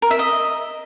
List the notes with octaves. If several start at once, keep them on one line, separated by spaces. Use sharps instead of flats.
A#4
E5
D#5